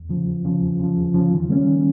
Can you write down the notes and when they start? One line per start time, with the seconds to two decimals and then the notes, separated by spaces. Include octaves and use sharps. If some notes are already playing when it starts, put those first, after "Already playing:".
Already playing: E2
0.09 C#3 F3
0.27 E2
0.45 C#3 F3
0.62 E2
0.79 C#3 F3
0.97 E2
1.14 C#3 F3
1.31 D#3
1.49 G3 A#3 C#4
1.66 D#3